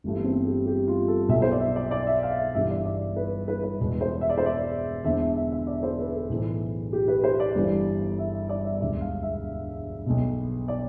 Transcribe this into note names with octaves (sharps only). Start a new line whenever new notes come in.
G1 G2 E3 A3
B3
C4
G4
G4
F4
A4
B1 B2 E5
C5
D5
E5
D5
D5
E5
F5
E5
G1 G2 E3 E5
D5
D5
B4
B4
B4
E1 E2 B2
C5
E5
D5
C5
D5
E1 E2 D3 E5
E5
E5
E5
D5
C5
B4
A4
B1 A2 E3
G4
B4
C5
D5
G1 G2 E3
E5
E5
D5
E5
E1 D2 D3 E5
F5
E5
B1 B2
D5